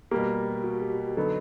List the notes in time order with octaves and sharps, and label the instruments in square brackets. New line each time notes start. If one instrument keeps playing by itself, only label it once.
[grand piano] B2 G3 A#3 [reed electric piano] G4
[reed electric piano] F#4
G4
[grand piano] D3 F#3 B3 D#4 [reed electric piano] A4